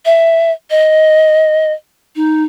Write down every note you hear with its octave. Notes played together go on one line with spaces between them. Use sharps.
E5
D#5
D#4